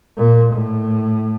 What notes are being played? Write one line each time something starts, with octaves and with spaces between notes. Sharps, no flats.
A#2
A2